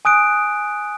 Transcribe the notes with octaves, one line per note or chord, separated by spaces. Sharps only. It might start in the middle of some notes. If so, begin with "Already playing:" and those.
G#5 D#6 F#6 D7